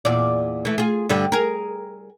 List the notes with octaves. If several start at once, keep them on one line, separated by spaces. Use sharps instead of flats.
E2 A#2 D5
E3 A3
F4 G#4
G2 D3 G3
G#4 A#4